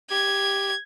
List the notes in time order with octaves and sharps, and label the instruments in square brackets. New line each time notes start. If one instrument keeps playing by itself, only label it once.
[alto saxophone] G4 [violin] G#6